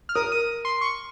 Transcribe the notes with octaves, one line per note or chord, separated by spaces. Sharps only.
F6
A#4 D#6
D#6
C6
C#6